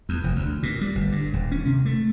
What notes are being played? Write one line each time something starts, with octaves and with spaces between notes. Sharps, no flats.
E2
F1
D2
A#2
G3
G1
G2
D#1
C#4
C3
A3